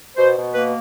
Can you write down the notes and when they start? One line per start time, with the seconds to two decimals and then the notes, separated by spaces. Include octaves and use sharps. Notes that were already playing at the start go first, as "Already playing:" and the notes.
0.16 B2 C5
0.36 B2
0.53 A#3 B4